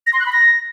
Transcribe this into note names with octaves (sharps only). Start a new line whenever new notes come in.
A#6
C6
F#6
B5
A#6